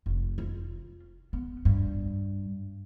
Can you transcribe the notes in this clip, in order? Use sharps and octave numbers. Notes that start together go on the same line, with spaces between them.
F1
F4
B3
G2